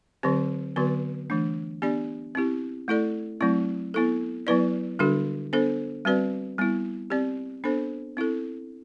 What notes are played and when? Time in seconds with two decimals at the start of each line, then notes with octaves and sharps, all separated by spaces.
0.23 D3 F#3 C4 G4 C5
0.76 D3 F#3 B3 F#4 B4
1.30 E3 A3 D4
1.82 B3 D4 G4 D5
2.35 C4 E4 G4
2.88 A3 E4 A4 D5
3.41 F#3 A3 C4 E4
3.94 B3 E4 A4
4.47 F#3 B3 E4 B4 D5
4.99 D3 G3 D4 F#4 A4
5.53 B3 D4 A4 C5
6.05 G3 C4 F#4 B4 D5
6.58 G3 B3 E4
7.10 C4 G4 D5
7.64 B3 D4 A4 C5
8.17 C4 E4 A4